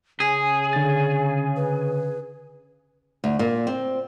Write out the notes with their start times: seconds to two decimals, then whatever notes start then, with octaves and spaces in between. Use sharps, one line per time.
0.20 C#3 G#4 G#5
0.73 D3 A6
1.56 B4
3.24 D2
3.39 A#2
3.67 C4